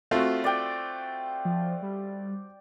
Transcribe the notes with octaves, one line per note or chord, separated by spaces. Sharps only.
A3 C4 F4 F#4
D5 G5
F3
G3